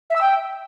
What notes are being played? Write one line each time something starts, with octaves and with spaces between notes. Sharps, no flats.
E5
E6
G5